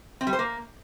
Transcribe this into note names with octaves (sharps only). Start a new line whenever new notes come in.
C4
G3
C5
A#3